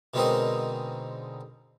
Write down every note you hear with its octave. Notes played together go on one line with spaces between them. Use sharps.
B2 D3 G#3 C4 D#4 A#4